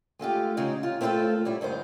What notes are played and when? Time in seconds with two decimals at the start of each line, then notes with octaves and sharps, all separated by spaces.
0.19 G#3 A3 F4 G4
0.57 C#3 G#3 D#4
0.83 F4
1.01 A3 C4 D4 E4 F4 A4
1.45 A2 G3 E4
1.61 D2 G2 D#4 C5